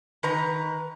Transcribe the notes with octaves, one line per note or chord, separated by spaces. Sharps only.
D#3 B4 A#5